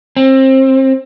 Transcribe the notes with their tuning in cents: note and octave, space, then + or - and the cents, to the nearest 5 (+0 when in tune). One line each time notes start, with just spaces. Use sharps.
C4 +25